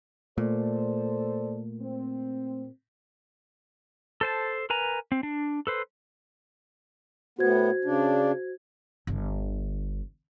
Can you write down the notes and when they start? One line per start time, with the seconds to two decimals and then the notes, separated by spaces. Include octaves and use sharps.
0.38 A#2 A3 A4 C5 D5
1.80 C4
4.21 A4 C5 A5
4.70 A#4 B4 G#5 A#5
5.12 C4
5.23 D4
5.67 A4 B4 C5
7.39 A2 B3 F#4 C5 G#6
7.84 C#3 D4
9.07 G1 D3